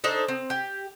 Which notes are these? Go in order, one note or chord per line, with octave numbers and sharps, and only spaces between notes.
D4 D#4 A4 C5
C4
G4